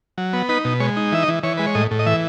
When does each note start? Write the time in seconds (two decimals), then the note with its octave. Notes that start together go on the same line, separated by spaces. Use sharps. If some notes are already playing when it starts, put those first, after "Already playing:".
0.18 F#3
0.33 B3
0.49 D#4 B4
0.65 B2
0.80 G#3 C#5
0.97 D#4
1.12 E3 E5
1.23 D#5
1.28 E3
1.43 E3 C#5
1.57 G#3 B4
1.67 C#5
1.75 A2 D#5
1.91 A2
1.99 D#5
2.06 E3 E5